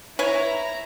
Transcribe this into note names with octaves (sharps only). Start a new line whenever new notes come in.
E4 B4 C#5 G#5 A#5